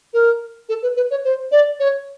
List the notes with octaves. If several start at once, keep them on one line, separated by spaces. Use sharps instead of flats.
A#4
A4
B4
B4
C#5
C5
D5
C#5